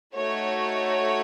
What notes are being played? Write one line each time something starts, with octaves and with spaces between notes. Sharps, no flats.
A3 D#4 F#4 C#5